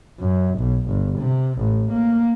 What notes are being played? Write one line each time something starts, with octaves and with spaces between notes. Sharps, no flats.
F#2
B1
G1
C3
A1
A#3